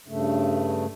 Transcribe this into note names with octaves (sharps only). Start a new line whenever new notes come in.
G2 C#3 A3